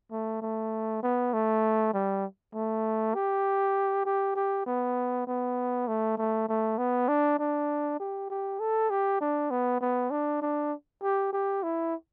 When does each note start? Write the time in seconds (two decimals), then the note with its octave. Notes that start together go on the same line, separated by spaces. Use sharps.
0.12 A3
0.42 A3
1.03 B3
1.33 A3
1.94 G3
2.55 A3
3.15 G4
4.06 G4
4.36 G4
4.66 B3
5.27 B3
5.88 A3
6.18 A3
6.49 A3
6.78 B3
7.09 D4
7.39 D4
8.00 G4
8.30 G4
8.60 A4
8.90 G4
9.21 D4
9.51 B3
9.81 B3
10.11 D4
10.42 D4
11.02 G4
11.32 G4
11.63 E4